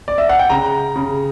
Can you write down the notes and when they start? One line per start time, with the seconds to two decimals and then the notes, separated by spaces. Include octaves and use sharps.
0.08 D5
0.18 E5
0.29 F#5
0.39 G5
0.49 C#3 A#5
0.96 C#3